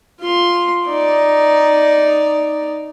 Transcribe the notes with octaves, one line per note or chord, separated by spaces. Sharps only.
F4 C6
D#4 D5